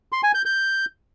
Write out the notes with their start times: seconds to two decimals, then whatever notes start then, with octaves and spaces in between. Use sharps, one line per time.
0.12 C6
0.23 G#5
0.34 G6
0.45 G6